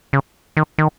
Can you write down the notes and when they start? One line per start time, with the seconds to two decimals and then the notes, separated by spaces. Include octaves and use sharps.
0.13 C#3
0.57 D#3
0.78 D#3